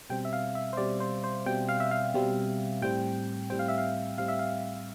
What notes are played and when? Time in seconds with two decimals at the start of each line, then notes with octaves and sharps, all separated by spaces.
0.10 B2 G3 C4 G5
0.25 E5
0.33 F5
0.55 E5
0.73 C5
0.77 B2 G3 C4 D5
1.00 C5
1.24 C5
1.46 B2 G3 C4 G5
1.69 F5
1.80 E5
1.91 F5
2.14 B2 G3 C4
2.82 A2 G3 C4 G5
3.50 A2 G3 C4 G5
3.59 F5
3.68 E5
3.78 F5
4.18 A2 G3 C4 F5
4.28 E5
4.39 F5